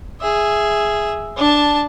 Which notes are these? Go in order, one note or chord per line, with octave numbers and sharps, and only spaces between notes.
G#4 E5
D4 A5